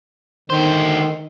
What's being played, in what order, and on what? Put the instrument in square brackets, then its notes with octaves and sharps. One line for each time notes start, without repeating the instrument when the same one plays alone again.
[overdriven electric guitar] D3 C5 [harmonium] D#3